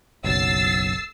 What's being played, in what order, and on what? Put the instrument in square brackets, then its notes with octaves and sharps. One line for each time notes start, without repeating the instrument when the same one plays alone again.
[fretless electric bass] F#1 B1 F#3 [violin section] E6 A6 C7